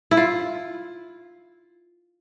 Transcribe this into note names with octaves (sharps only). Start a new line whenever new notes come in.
E4
F4